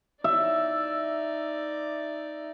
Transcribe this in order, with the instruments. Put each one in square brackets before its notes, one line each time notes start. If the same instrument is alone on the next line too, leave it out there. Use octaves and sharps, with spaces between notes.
[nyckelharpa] D#4 D5 [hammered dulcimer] E5